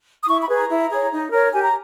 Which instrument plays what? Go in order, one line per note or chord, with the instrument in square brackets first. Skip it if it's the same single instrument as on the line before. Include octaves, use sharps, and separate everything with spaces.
[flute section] D#6
E4 C#6
B5
G#4 B4
A#5
E4
G#4 C#5
D#4
A#4 C#5
G4 G#5
A#5